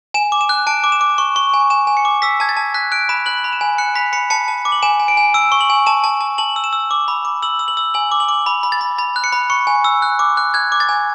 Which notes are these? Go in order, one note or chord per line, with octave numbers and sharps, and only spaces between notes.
G#5 E7
D6
E7
F#6
A5 D7
D6
E7
D6
C#6
C#6
G#5
G#5 E7
G#5
C#7
D6
E6 B6
A5 G#6
A6
A5
F#6 B6
F#6 D7
B5 E7
F#6 F#7
B5
E7
G#5
F#6 C#7
B5 B6
B5 C#7
A5 C#7
A5
D6
F#7
G#5 E7
G#5
D7
G#5
E6 D7
C#6
F#7
G#5
A5 E7
A5
A5
A5 F#7
E6
E7
E6
D6
B5
D6
E6 F#7
E6
F#7
E6
G#5 F#7
D6
F#7
D6
B5
B5
A6
B5
B5 A6
F#6
C#7
B5
C#6 C#7
G#5
E6
F#6
D6
F#6
F#6 G#6
D6
A6
G#5